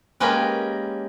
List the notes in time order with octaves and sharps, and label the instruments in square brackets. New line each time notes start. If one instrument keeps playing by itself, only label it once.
[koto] G#3 A#3 C#4 G4 B4